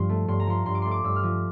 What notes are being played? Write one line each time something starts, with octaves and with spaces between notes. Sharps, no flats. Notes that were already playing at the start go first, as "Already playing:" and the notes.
Already playing: G2 F3 C6
A3
G2 C6
A#5
F3 C6
G2 C6
D6
A3 C6
D6
G2 E6
F6
F3